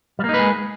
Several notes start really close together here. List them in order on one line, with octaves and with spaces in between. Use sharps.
G3 A#3 D#4 B4 G#3